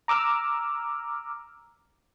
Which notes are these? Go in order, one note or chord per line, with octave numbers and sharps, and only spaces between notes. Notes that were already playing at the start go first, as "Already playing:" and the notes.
A#5 D6 E6 F6